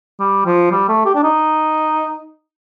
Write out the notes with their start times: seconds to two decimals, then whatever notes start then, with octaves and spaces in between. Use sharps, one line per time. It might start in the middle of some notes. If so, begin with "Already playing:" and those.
0.20 G3
0.46 F3
0.72 G3
0.89 A3
1.05 G4
1.15 D4
1.23 D#4